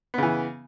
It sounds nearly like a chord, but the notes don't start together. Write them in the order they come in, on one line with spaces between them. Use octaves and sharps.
B3 C#3 E3